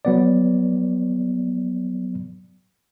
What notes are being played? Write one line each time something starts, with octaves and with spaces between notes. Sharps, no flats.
F#3 B3 D5